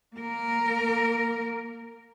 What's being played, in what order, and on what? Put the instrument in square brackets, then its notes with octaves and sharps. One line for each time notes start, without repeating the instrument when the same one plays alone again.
[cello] A#3 A#4